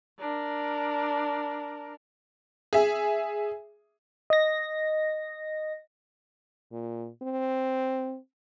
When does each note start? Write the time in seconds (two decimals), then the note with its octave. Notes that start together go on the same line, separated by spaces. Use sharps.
0.20 D4 A#4
2.73 G#4 E5
4.30 D#5 A#6
6.72 A#2
7.22 C4